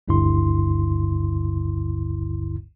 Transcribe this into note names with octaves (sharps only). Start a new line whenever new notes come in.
G1 D2 G2 D3 E4 C6